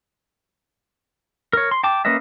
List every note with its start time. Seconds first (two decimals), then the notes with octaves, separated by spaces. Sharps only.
1.53 A#4 C#5
1.71 C6
1.84 G5 A5 D6
2.05 A#3 C#4 B4 D#5 E5